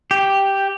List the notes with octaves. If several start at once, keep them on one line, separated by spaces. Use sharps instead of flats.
G4